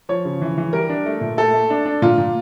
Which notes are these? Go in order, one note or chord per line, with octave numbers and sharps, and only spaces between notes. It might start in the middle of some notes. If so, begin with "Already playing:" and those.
F3 C#5
C#3
E3
E3
G3 A#4
D4
A3
A#2
A3 A4
A3
D4
D4
A#2 F4
A#2